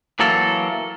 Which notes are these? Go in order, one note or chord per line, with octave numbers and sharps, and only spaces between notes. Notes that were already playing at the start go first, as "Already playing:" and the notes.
E3 F#3 A#3 A4